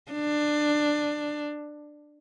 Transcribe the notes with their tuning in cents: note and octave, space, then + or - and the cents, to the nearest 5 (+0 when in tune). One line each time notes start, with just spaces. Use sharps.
D4 +15